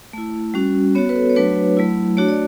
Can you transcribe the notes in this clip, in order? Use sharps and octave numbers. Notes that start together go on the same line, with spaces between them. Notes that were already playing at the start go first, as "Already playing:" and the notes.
A3 E4
G3 C#4 F#4
B3 F#4 C#5
B4
A4
C#5
F#3 A3 D4 F#4 B4
F#3 A3 E4
A3 D4 F#4 C#5
D5